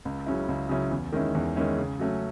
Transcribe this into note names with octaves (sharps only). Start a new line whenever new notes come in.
C#2
C#3 F#3 C#4 E4
C#2
C#3 F#3 C#4 E4
E2
D#3 G#3 C#4 E4
E2
D#3 G#3 C#4 E4
C#3
F#3 A3 C#4